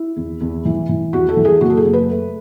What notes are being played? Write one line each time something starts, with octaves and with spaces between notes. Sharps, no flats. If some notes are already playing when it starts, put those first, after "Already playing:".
Already playing: E4
E2
E2
E3
E3
E2 F#4
A4
E3
G#4
F#1 F#4
A4
G#4
F#1
B4
A3